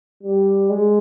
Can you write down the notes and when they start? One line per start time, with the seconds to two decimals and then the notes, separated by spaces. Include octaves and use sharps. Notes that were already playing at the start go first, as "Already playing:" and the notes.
0.23 G3
0.70 G#3